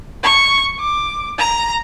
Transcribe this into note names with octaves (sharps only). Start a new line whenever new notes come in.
C#6
D6
A#5